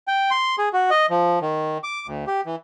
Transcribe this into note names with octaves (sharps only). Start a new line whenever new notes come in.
G5
C6
G#4
F#4
D#5
F3
D#3
D6
D2
G4
E3